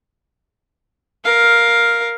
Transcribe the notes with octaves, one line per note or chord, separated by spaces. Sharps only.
A#4 F5